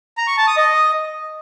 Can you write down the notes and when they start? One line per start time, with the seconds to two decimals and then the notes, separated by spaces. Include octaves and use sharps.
0.18 A#5
0.27 C#6
0.37 A5
0.47 D#6
0.57 D#5